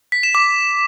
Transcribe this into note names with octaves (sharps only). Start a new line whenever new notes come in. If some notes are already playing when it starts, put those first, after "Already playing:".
B6
E7
D6